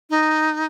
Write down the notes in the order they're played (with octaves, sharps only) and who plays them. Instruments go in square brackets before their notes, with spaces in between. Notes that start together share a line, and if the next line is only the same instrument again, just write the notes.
[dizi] D#4